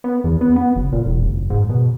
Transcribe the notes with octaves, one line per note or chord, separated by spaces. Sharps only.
B3
E2
B3
B3
F#1
A#2
E1
F#1
G#2
B2